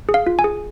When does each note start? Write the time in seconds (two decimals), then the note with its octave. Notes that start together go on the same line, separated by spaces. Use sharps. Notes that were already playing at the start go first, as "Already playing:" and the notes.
0.09 G#4
0.14 F5
0.27 F4
0.39 G#5
0.44 G#4